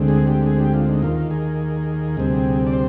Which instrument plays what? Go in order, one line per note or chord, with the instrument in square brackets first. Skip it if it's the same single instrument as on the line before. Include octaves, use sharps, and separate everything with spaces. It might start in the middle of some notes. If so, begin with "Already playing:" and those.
Already playing: [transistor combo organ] D2 D3 G#3 C4
G#4
G4
G#4
G4
F4
D#4
D#2 D#3 A#3 F4
G#4
D2 C3 G3 C4
D5
C5